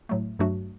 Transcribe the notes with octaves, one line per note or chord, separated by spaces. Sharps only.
A2 F#3 A3
G2 F#3 A3 D4 F#4